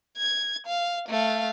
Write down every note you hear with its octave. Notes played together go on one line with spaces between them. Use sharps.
G#6
F5
A3 F5